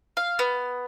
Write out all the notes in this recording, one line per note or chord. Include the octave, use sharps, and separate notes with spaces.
F5
B3